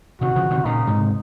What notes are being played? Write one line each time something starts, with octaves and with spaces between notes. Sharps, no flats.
C3 D#3 F#4
C#3 F3
C3 D#3
A#2 C#3 D#4
G#2 C3